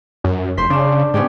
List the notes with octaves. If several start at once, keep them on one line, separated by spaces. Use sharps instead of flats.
F#2
F1 C5 C6 B6
C#3 D4 E7
G#2 B3 C#4 G4